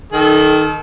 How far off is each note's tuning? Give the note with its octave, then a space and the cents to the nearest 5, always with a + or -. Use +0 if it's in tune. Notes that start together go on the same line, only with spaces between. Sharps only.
D#3 +0 A4 -30